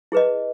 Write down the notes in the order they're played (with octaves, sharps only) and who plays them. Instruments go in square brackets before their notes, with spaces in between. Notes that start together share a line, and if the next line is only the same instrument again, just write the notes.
[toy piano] E4 G#4 B4 D#5